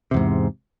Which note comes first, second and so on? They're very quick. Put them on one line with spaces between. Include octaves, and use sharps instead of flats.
C3 E2 G#2